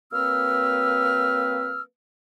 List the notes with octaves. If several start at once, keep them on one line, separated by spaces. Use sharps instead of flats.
F#3 A#3 C4 B4 E6 F6